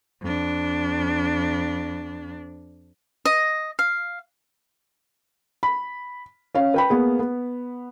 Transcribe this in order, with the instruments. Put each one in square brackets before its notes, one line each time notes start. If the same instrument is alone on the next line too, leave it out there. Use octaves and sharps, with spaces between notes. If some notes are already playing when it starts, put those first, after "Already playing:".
[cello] F2 D4
[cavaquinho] D#5
F5
[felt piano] B5
C#4 C#5 F5
B4 G5 B5
A#3 B3 G#4
B3